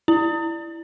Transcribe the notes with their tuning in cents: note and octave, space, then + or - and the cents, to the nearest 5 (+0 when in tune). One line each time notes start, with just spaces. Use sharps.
E4 +15